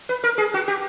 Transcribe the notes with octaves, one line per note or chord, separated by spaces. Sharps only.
B4
A#4
G#4
F#4
G4